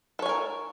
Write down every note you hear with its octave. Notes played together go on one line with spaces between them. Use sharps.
A4 A#4 C#5 G#5